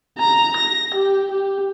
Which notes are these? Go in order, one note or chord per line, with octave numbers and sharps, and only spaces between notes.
A#5
A#6
G4
G4